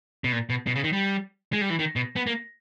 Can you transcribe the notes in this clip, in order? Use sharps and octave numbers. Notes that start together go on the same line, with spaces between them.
B2
A#2
B2
B2
C#3
D#3
G3
G#3
G3
E3
D#3
B2
B3
A#3